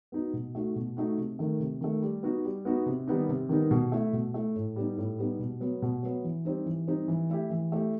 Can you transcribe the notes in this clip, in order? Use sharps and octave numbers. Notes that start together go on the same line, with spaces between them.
B3 D#4 F#4
B2
A3 D#4 F#4
B2
A3 D#4 F#4
C3
D#3 A3
C3
D#3 A3
G3
B3 D#4 F#4
G3
B3 D#4 F#4
C3
D#3 G3 B3 D#4
C3
D#3 G3 B3 D#4
B2
A3 E4
B2
A3 E4
A2
G3 B3 D#4
A2
G3 B3 D#4
B2
F#3 B3
B2
F#3 B3
E3
G3 C4 D#4
E3
G3 C4 D#4
E3
A3 E4 G4
E3
A3 E4 G4